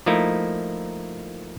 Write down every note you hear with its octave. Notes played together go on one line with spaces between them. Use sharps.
F3 A3 A#3 D#4 E4